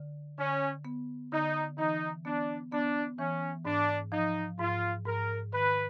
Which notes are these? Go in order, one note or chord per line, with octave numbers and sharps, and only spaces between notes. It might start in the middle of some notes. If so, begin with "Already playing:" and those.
Already playing: D3
D3 C#4
B3
D3 D#4
E3 D#4
B3 D4
B3 D4
E3 C#4
G#2 D4
F3 D#4
G#2 F4
G#2 A#4
D#3 B4